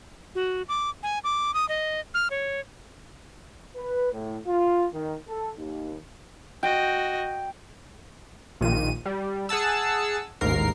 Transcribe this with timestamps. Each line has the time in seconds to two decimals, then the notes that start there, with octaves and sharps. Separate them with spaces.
0.35 F#4
0.69 D6
1.03 G#5
1.24 D6
1.54 D#6
1.69 D#5
2.14 F6
2.30 C#5
3.76 B4
4.13 A2
4.47 F4
4.94 D#3
5.28 A4
5.58 D#2
6.63 F#4 D#5 G5
8.61 A#1 A#2 D#3 D#7
9.06 G3
9.49 G#4 F#5 A5 E6
10.41 A1 D#2 G#2 A#4 C7